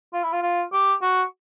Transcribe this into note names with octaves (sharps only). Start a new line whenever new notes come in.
F4
E4
F4
F4
G4
F#4